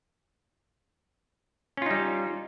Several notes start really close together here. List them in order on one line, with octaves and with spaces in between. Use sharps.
C#4 F4 D#4 G3